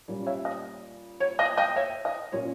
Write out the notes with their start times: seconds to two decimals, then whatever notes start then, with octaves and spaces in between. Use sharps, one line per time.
0.08 A#2 G3 A#3 C#4
0.26 C#5 E5
0.45 D#5
1.20 C#5
1.39 D#5
1.57 D#5 G5
1.76 C#5 E5
2.05 D#5
2.32 A#2 A#3 C#4 C#5